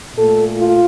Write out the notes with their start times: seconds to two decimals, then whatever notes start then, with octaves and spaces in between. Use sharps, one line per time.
0.16 A#2 A3 A4
0.57 F4